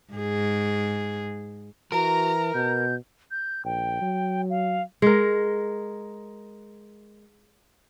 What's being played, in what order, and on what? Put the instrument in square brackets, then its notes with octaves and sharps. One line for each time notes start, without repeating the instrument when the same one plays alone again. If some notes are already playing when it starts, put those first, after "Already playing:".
[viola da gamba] G#2 G#4
[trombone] E3 [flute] F#4 [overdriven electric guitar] A#4 [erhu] A#5
[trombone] B2 [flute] G6
[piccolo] G6
[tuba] A#1 [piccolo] G5
[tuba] F#3
[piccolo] F5
[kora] G#3 A#4